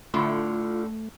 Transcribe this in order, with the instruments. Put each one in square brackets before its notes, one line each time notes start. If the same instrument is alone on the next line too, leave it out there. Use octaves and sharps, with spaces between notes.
[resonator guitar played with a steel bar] A2 D3 [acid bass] A3 [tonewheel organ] F4